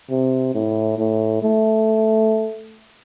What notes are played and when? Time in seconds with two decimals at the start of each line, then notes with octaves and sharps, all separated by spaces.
0.10 C3
0.54 A2
0.99 A2
1.43 A3